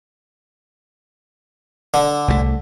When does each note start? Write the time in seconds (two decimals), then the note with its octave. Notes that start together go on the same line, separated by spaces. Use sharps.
1.94 D3
2.28 C2 F3 A3